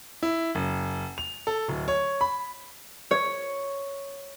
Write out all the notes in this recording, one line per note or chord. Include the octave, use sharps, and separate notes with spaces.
E4
F#1
F7
A4
D1
C#5
B5
C#5